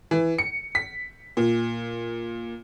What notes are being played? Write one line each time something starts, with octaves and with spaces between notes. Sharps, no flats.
E3
C#7
B6
A#2